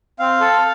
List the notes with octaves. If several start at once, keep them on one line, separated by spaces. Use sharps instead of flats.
C4 F5
A4